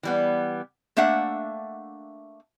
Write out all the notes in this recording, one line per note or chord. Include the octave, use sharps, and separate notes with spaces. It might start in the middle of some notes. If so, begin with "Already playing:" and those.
E3 G3 B3
A3 A#3 D4 E5 F#5